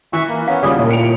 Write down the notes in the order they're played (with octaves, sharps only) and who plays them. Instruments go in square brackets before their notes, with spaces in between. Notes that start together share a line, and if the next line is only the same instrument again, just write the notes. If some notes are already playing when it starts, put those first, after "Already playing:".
[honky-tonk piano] E3 [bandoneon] E5 C#6
[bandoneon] A#3
[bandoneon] B3 C#4 [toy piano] F5
[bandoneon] D#2 A2 [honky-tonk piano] C#3 G3 F4 [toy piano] D5 D6 D#6
[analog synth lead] A#2
[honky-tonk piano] C#7 D7 F7